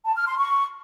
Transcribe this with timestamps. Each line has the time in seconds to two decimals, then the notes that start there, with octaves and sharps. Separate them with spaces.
0.05 A5
0.16 F6
0.27 C6
0.37 C#6